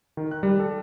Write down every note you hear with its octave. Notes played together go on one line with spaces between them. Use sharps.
D#3
F#6
G3
A4